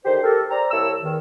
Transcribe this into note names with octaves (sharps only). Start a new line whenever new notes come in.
D3 D#3 G4 C5
G4 A4 A#4
C5 D5 G5 A#5
C2 A#3 E4 C#5 A5 E6
E2 D#3